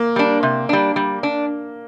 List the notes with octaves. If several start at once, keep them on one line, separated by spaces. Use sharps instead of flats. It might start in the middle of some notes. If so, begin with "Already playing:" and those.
Already playing: A#3
G3 D4
C3
G3 D4
G3
D4